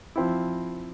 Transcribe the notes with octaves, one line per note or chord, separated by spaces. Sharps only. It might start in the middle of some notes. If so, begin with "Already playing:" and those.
F3 C4 E4